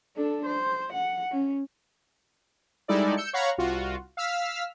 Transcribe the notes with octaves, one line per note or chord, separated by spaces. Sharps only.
D4 A4
C5
F#5
C#4
G3 G#3 D#4 E4 A4 D5
E6 G6 C#7
C#5 F5 F#5 A#5 B5 C#6
C2 F4 F#4
F5 E6 F6 B6